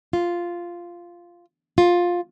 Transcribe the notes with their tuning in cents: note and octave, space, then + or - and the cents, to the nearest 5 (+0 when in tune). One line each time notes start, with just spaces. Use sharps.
F4 -5
F4 +10